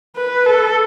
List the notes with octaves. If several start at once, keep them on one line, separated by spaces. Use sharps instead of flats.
B4
A4